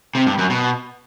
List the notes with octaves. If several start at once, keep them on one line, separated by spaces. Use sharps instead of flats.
C3
G2
F#2
B2